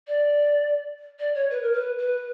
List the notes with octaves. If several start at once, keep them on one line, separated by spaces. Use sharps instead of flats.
D5
D5
C#5
B4
A#4
B4
B4